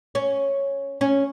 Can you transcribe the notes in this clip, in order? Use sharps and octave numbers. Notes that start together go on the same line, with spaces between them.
C#4
C#4